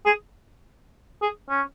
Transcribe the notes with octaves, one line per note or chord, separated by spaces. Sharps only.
G#4
G#4
C#4